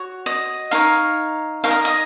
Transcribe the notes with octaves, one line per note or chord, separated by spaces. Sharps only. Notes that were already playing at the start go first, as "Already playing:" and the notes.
Already playing: F#4 C#5
D#5
D#4 A#4 C#5 F5
D#4 A#4 C#5 F5
D#5
D#5